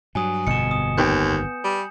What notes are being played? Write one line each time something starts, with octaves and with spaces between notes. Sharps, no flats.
G2 F#3 G#5 D#6
G1 F2 G#2 B2 C#7 E7
D#6
D#2 B3 G5 G6
G3